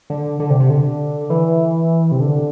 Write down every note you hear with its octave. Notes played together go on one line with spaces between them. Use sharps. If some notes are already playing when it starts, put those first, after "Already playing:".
D3
D3
C3
C3
D3
E3
C3
D3